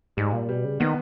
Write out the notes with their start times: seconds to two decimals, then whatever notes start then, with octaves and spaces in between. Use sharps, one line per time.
0.17 G#2 G3
0.32 A#2
0.49 B2 G3
0.64 C#3
0.80 D#3 B3